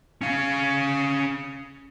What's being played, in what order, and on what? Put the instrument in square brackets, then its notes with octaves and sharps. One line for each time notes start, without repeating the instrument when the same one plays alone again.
[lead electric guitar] C#4 F5